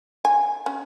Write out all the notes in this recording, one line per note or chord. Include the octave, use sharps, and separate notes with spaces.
G#5
C#4